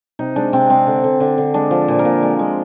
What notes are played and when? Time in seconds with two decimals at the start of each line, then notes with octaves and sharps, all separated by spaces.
0.19 C3 D#4
0.36 G#3 D4
0.53 C3 C4
0.70 G#3 C4
0.87 D3
1.04 D3
1.20 D3
1.38 D3
1.54 G#3 D4
1.71 F3
1.88 A#2
1.99 A#4
2.05 A#2
2.22 G#3
2.39 G#3